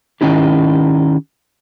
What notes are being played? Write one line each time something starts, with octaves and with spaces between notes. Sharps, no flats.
D#3 F3 C#4 D#4 E4 G4